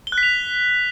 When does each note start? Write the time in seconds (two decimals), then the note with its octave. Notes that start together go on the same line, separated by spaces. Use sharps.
0.07 G7
0.12 F#6
0.18 B6
0.23 F7